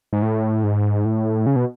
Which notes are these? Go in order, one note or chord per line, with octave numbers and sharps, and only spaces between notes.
G#2
A2
G#2
A2
C#3
B2